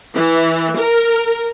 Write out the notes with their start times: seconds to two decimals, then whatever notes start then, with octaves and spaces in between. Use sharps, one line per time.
0.15 E3
0.78 A#4